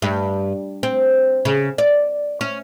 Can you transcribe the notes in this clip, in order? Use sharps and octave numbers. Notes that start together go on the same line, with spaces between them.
G2
C4
C#3
D5
C#4